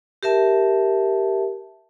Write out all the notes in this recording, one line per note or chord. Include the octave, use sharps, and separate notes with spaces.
G4 A#4 E5 A5